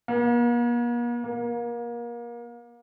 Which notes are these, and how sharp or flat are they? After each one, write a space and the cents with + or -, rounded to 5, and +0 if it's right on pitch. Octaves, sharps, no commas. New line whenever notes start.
A#3 +45
A#3 +30